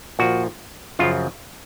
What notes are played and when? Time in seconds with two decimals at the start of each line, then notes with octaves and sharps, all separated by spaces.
0.19 A#2 F3 F#4
0.99 F#2 C#3 F3 F4